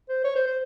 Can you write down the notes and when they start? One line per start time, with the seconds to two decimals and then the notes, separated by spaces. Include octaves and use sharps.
0.09 C5
0.24 C#5
0.35 C5
0.47 C5